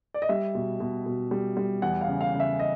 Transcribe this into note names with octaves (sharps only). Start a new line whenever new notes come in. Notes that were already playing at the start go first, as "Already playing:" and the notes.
D5
D#5
G3 E5
B2
B2
B2
G3
G3
E2 F#5
F5
C#3
F5
C#3
E5
D#5